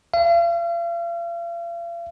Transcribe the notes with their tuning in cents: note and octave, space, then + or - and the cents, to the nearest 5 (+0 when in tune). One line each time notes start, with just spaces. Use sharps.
F5 -40